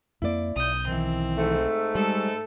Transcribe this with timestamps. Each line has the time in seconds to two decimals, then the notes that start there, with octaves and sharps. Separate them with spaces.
0.22 F2 A3 A#3 E4 D5
0.56 B1 D#6 G6
0.87 D#3 E3 C4
1.37 G#2 A3
1.95 G3 G#3 A4